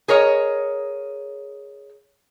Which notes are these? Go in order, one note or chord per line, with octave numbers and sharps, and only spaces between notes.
G#4 A#4 C#5 D#5